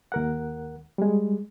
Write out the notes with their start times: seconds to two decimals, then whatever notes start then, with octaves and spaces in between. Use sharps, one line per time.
0.12 D#2 A#4 F#5
0.98 G3 G#3